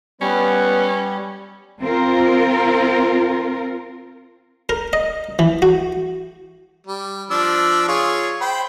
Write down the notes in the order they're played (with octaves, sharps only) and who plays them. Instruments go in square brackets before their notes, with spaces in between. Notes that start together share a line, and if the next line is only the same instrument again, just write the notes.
[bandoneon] G3 [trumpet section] B3 B4 [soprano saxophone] C#4
[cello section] C4 F4 A#4
[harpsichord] A#4
D#5
E3
F#4
[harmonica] G3
F3 D4 E6
F4 G#4 C#5
C5 G5 B5